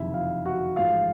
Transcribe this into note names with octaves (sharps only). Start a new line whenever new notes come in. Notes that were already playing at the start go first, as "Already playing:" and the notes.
Already playing: F#1 F2 C3 D#3 E4 E5
F4 F5
F#4 F#5
A1 G#2 F3 F4 F5